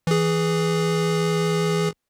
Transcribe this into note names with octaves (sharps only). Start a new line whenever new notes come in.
E3 G#4